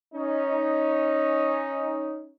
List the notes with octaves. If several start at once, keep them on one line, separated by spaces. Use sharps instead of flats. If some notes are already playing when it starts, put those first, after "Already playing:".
C#4 D#4